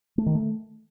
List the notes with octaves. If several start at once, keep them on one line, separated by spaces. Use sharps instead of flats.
A3
D#3
A3